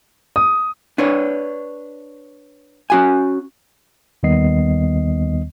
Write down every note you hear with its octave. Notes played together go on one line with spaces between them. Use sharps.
D#6
D4 B4 C#5
C#4 F#4 G#5
D#2 D#3 G3 B3 D#5 C7